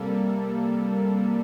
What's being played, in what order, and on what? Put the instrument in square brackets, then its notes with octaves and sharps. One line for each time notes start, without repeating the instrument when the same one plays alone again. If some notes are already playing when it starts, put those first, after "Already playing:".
Already playing: [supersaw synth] C3 G3 A#3 A4